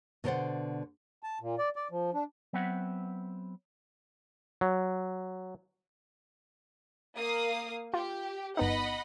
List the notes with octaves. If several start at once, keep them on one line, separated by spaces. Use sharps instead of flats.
B2 D3 A#4 C5 D5 F#5
A5
A#2
D5
D5
F3
D4
F#3 B3 C4 B4 E5 F#5
F#3
A#3 F5 D#6
F4 G4
G1 B3 D#4 D#5 F#5 B5